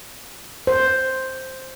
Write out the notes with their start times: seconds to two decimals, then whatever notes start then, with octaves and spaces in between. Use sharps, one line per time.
0.67 C5